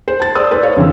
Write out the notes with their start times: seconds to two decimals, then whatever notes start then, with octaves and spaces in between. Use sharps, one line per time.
0.08 C5
0.20 A5 A6
0.35 C5 D5 D#6 E6
0.51 B4 C5 D5
0.63 C#5 F5
0.77 F2 D3 E3 E6